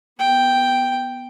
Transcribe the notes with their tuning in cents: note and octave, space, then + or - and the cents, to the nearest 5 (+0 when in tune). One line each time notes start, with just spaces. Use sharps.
B3 +0 G5 +0